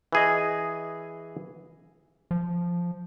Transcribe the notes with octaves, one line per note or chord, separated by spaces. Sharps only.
E3 G#4 D#5
F3